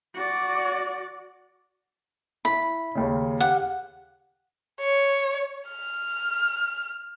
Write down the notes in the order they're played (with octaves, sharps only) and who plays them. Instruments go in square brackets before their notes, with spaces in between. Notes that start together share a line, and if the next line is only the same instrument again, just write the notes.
[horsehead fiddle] F#4 D5
[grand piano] E4 [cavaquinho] B5
[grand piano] D#2 C#3
[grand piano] G4 F5 [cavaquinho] F#5
[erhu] C#5
F6